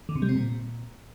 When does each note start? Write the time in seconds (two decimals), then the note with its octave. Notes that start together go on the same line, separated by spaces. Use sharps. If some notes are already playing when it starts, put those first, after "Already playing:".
0.09 D3
0.15 C3
0.22 G3
0.29 C4
0.35 A#2